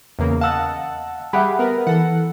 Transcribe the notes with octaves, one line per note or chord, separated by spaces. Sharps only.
E2 C#3 A#3
D#5 F5 F#5 A5 E6
G3 G4 G#4 E5 F#5 B5
B3 A#4 B4
E3 A4 F#5